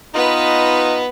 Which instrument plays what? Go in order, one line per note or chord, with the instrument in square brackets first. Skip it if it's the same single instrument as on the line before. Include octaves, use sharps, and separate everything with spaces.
[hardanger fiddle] B3 B4 [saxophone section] D#4 F4 D#5